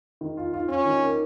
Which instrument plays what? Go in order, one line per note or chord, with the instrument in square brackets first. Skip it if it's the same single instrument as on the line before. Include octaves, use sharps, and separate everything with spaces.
[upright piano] D#3
F4
F4
[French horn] C#4 [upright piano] F4
[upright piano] D#3
A#3